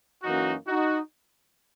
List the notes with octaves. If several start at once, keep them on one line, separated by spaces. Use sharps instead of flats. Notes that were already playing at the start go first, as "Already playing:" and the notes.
F#2 E3 A#3 C#4 D#4 F#4
D#4 F#4